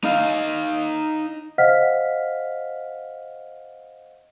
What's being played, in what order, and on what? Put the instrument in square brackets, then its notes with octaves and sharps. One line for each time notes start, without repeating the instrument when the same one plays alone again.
[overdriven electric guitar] D#4 F5
[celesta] C5 D#5 F5 F#5 F6 B6